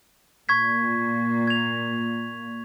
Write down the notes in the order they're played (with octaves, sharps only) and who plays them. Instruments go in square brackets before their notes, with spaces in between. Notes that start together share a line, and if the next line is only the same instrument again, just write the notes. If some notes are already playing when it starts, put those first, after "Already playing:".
[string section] A#2 [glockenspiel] C#6 G#6 B6
[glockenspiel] G#6 F7